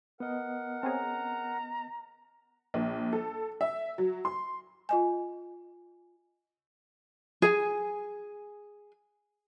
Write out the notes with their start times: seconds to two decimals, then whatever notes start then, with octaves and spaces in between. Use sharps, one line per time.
0.20 B3 A#4 D#5 F#5
0.83 C4 C#4 G#4 A#5
2.74 A#1
3.13 A4
3.61 E5
3.98 F#3
4.25 C6
4.89 F4 D#5 G#5
7.42 G#4 G#5